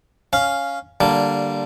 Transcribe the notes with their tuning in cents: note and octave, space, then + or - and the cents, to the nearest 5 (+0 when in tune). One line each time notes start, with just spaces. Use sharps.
C#4 +0 F5 +0
D3 +0 G3 -15 A#3 +0